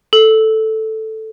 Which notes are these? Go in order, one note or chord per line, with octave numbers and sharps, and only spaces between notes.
A4